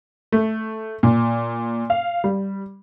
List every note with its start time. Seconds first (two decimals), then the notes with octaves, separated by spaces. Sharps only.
0.32 A3
1.03 A#2
1.90 F5
2.24 G3